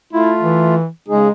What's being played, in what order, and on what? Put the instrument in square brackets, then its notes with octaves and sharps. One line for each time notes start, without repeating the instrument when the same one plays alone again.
[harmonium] A3 F4 [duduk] E4
[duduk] E3
[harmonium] C#3 D#4 G#4 [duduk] G#3